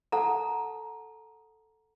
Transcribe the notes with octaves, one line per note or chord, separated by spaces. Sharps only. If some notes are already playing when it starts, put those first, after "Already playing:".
A4 F#5 A5 A#5